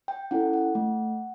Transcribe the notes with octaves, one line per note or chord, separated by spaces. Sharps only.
G5
C#4 E4 A4 F#5
F#5
A3